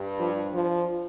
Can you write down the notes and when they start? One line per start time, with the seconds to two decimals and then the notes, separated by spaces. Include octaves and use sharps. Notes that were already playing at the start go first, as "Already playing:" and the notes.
Already playing: G2
0.19 F3
0.53 F3